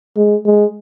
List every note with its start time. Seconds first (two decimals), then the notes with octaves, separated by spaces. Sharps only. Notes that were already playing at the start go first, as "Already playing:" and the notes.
0.17 G#3
0.45 G#3